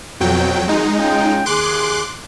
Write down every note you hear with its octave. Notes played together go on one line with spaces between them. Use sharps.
F2 B2 F#3 G5
A#1 D#3 G#3 D#4 F#4
C#4 F4 G5
D#2 G#4 C6 D6 F#6